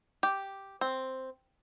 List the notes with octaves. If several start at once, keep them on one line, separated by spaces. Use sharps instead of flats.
G4
C4